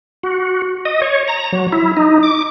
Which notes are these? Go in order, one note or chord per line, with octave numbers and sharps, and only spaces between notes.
F#4
D#5
C#5
A#5
F#3
E4
D#4
D6